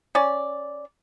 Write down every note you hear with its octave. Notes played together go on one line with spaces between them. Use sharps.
C#4 D5